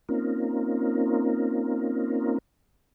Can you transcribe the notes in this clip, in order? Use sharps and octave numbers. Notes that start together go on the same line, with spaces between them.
A#3 C4 C#4 D#4 F4 A#4